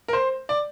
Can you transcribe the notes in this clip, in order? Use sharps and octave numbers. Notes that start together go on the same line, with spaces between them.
A#4
C5
D5